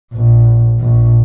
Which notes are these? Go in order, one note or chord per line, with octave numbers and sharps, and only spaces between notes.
A#1
A#1